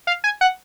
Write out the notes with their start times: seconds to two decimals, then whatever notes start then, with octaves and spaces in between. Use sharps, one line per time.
0.07 F5
0.24 G#5
0.41 F#5